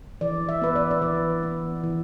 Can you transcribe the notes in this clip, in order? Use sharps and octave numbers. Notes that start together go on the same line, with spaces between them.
E3 D5
E5
B3 B4
D5
D5
E3 B4
B3
E3